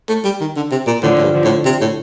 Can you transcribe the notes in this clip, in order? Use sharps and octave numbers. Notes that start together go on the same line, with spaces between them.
A3
G3
D#3
D3
C3
A#2
A2 D3 F3
A2
G2
D3 F3
A2
C3
A2